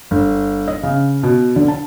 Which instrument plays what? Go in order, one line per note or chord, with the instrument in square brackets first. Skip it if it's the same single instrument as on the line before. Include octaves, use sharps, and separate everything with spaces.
[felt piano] G1
D#5
C#3
B2
D3
A5